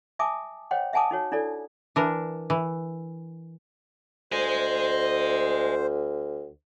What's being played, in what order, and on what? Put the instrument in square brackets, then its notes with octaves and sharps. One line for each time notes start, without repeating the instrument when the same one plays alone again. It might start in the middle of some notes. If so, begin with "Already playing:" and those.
[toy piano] E5 G#5 A5 D6 D#6
C5 C#5 D#5 F#5 G5 C6
E5 F#5 G#5 A5 D6 D#6
D#4 F#4 C#5
D4 E4 A4 D5
[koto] E3 D4 A#4
E3
[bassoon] D2 [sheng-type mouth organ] C5 [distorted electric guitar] D#5 G#5